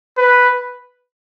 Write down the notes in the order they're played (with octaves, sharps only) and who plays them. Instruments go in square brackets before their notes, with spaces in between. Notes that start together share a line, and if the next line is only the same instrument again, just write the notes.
[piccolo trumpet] B4